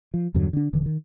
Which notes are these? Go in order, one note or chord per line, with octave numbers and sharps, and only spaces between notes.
F3
E2 G2 D3 F#3
D3 D4
D#1 D3 E3
D#3